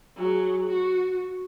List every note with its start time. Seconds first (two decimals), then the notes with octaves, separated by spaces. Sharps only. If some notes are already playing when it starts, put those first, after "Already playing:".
0.17 F#3 G#4
0.67 F#4